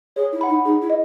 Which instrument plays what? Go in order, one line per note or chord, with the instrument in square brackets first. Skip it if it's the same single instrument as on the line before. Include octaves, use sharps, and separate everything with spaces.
[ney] G#4 [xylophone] C#5
[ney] E4
[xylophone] F#5 B5
[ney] D#4
[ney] D#4 [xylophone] G#4
[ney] E4
[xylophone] D#5